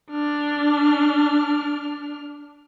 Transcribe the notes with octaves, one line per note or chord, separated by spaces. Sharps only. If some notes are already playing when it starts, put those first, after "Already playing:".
D4 F6